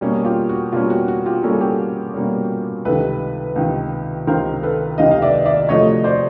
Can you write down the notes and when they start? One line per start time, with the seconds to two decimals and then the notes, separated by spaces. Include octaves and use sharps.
0.01 B2 G3 A#3 C#4
0.24 F4 G4
0.49 F#4
0.72 B2 G3 A#3 C#4 F4
0.90 F#4
1.08 F#4
1.26 F4 G4
1.43 B2 G3 A#3 C#4 A4
1.53 G#4
1.61 G4 A4
2.14 B2 G3 A#3 C#4
2.85 C#2 C3 D#3 A4 B4
3.56 C#2 C3 D#3
4.27 C#2 C3 D#3 A#4 C5
4.63 A4 B4
4.98 C#2 C3 D#3 D#5 F5
5.11 F5
5.22 D5 E5
5.46 D5 E5
5.69 D2 C3 F3 A3 C#5 D#5
6.04 C5 D5